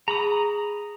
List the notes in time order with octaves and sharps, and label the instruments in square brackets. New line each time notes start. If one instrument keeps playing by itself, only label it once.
[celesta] G#4 [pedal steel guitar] A#5 B5 D#6